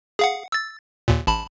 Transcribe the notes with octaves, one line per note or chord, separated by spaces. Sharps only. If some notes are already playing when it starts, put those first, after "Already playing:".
G#4 F5 F#5
E6 A6
D#2 A#2
A1 A5 B5